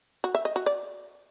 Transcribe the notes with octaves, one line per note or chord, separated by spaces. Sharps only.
F#4
E5
D#5
F#4
D5